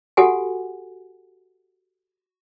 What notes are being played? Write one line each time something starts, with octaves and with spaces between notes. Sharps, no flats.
F#4 G4 A4 F#5 G#5